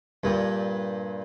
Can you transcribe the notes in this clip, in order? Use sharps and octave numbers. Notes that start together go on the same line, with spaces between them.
G2 A#2